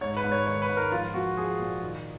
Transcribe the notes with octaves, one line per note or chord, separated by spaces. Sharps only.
G#2 C#5
B4
G#2
C#5
D#3 C#5
B4
G#2
A#4
F3 F4
F3 F#4
F3 G#4
A#2
D#3